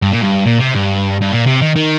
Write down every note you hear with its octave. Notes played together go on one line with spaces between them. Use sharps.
G2
A#2
G2
A#2
C3
G2
G2
A#2
C3
D#3
D#3